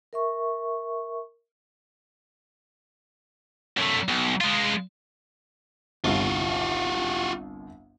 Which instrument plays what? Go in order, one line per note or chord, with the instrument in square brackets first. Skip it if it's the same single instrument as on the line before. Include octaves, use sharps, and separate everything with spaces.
[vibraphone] A#4 E5 C#6
[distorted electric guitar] F#2 A3
B1
G#3 F4
[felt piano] G1 C2 [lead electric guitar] F4 F#4